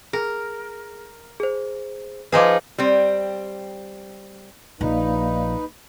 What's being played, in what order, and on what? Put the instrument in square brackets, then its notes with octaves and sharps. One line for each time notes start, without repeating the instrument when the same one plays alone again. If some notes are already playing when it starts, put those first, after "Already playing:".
[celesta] G#4 [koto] A#4
[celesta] G#4 C5
[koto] F3 D#4 G#4 [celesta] B4 D#5 D6
[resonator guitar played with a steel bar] G3 C4
[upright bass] A#1 F3 [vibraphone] A#3 D5 F5 [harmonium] D#4 B4